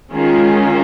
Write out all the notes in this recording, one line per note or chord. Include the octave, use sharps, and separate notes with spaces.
D#3 G#3 C#4 F4 G#4